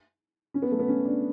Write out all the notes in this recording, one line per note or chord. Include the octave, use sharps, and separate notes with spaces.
C#4
B3
A3
B3
C#4
D4